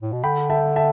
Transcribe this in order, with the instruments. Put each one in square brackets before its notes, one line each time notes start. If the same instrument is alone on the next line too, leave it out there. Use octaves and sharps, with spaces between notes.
[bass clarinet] A2
B2
[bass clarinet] D3 [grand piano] G5 B5
[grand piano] E5 A5
E5 A5